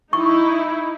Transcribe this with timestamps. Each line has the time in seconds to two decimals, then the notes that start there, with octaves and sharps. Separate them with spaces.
0.13 D#4 E4 C#6